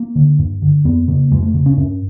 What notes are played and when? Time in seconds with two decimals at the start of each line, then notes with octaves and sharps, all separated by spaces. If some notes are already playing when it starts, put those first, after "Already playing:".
Already playing: A#3
0.16 D3
0.39 G2
0.62 D3
0.84 F2 B3
1.08 C#3 A#3
1.31 F2 G#3
1.43 A3
1.54 C#3
1.66 C#4
1.77 G2 C#4